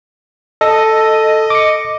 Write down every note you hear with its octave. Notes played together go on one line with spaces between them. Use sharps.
A4 D#5
D6 C#7